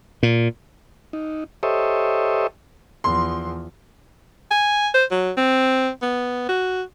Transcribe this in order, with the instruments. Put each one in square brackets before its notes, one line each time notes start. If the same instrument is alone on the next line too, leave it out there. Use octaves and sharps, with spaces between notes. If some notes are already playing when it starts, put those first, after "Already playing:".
[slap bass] A#2
[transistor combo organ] D#4
G4 A4 C5 C#5 D#5 E5
[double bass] E2 F3 [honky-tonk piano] C6
[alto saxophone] G#5
C5
F#3
C4
B3
F#4